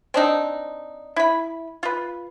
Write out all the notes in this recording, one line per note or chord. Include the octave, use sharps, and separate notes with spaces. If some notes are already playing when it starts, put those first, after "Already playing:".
C4 D4 D#4
E4 B5
F4 B4